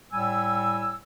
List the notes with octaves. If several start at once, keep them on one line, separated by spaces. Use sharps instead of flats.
A2 G3 G#5 E6